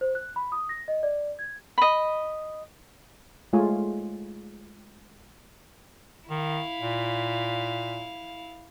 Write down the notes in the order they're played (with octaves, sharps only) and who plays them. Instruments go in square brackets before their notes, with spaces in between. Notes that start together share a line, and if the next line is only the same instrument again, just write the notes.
[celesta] C5
F#6
B5
D#6
A#6
D#5
D5
G#6
[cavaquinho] D#5 B5
[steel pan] G#3 A3 F4 C#5 G#5
[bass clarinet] D#3 [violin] E4 F5
[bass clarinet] A#2